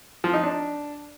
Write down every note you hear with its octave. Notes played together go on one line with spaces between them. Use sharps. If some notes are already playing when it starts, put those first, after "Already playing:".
F3
D#4
D4